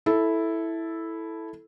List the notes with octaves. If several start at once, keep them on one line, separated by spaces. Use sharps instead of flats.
E4 A4